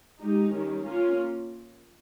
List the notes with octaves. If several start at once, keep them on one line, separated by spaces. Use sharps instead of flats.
G#3 D#4 G4
D#3 G3 C#4
A#3 C#4 F4